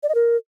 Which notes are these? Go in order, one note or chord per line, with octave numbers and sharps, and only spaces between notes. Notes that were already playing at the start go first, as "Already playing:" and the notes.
D5
D#5
A#4